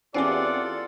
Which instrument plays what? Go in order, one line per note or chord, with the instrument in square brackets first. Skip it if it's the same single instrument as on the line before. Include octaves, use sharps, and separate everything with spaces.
[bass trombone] E2 [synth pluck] C4 C#4 G4 [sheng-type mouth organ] F4 A4 F#5 [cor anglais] D5